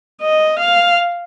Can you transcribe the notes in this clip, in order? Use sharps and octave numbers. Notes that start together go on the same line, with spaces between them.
D#5
F5